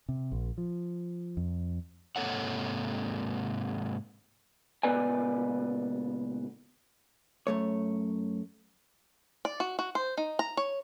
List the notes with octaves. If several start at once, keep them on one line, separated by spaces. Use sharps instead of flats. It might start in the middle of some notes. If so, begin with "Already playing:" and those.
C3
A#1
F3
F2
G#2 C3 A#3 A4 C#5 F#5
C#2 A#2 B3 B4 D5 G#5
F#2 A3 C#5
D5
F#4
F#4
C5
D#4
A#5
C#5